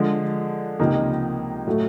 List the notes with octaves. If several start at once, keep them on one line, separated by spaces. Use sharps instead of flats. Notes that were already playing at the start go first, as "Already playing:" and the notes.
Already playing: D3 F3 G#3
C#2 C3 F3 A#3 D#4
A2 F#3 A3